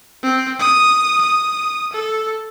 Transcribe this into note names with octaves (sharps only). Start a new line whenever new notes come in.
C4
D#6
D#6
A4